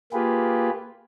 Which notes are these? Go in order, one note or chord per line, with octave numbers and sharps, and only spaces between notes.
A#3 F4 G4 G#4 B4